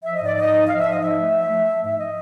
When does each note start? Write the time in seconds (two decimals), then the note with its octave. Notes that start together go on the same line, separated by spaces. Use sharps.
0.04 F3 E5
0.16 D#5
0.21 G#2
0.26 D5
0.37 G#2 D#5
0.53 F3
0.69 F3 F5
0.79 E5
0.85 G#2
0.91 D#5
1.01 F3 E5
1.18 A3
1.34 F3
1.50 A3
1.66 F3
1.82 G#2 E5
1.99 D#5